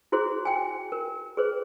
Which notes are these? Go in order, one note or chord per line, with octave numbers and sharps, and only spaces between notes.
E4 F#4 G#4 C5
G5 G#5
A#4
G#4 B4 C5